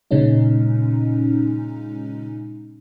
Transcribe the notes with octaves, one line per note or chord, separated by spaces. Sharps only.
A#2 C#3 G#3 C#4 D#4